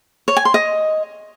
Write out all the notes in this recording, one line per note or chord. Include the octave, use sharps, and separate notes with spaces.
C#5
G#5
C6
D#5